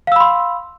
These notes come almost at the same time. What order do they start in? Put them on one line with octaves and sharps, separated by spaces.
F5 E6 B5 C6